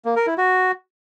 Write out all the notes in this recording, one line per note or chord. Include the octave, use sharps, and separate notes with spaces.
A#3
A#4
E4
F#4